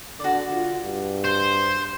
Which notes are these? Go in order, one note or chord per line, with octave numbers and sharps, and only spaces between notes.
D3 F#4 D5
F4
G2
C5